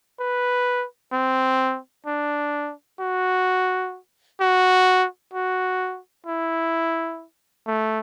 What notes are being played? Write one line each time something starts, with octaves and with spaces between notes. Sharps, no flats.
B4
C4
D4
F#4
F#4
F#4
E4
A3